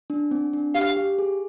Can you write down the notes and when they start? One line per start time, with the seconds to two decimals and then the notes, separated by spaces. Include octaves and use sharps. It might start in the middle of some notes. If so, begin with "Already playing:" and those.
0.10 D4
0.31 C4
0.53 D4
0.75 G4 F5
0.97 G4
1.19 G#4